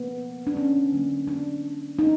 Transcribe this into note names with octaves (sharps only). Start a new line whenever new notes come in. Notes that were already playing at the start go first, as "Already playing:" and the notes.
Already playing: C#3 F3 A#3 B3
D4
C#4
D3 F#3 A#3
D4
D#4